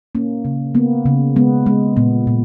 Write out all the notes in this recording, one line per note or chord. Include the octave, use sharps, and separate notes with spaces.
A#3 C#4
C#3
A#3 B3
C#3
G#3 B3
G#3
A#2 B3
A#2